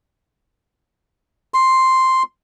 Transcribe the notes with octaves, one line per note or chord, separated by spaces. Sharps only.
C6